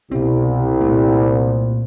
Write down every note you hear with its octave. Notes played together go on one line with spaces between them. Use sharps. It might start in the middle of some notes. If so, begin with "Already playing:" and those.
C2 B2 C4
A#2 A3 A#3